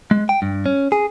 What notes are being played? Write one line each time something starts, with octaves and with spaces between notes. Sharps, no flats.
G#3
G5
G2
C#4
G#4